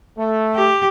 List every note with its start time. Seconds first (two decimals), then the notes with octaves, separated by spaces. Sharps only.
0.18 A3
0.56 G4